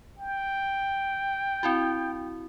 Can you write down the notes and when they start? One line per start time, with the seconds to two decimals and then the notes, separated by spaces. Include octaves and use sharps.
0.19 G5
1.63 C4 E4 F#4